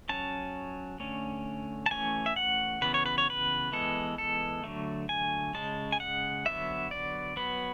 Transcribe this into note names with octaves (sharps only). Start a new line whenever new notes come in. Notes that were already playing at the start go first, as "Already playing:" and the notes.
F#3 C#4 A5
D3 A3 C#4
A5
E3 A3 C#4 G#5
E5
F#5
C#3 E3 B3 B4
C#5
B4
C#5
B4
E3 G#3 B3 A4
A4
D3 F#3 A3
G#5
C#3 G#3 C#4 A5
G#5
F#5
D3 F#3 B3 E5
D5
F#3 B3 B4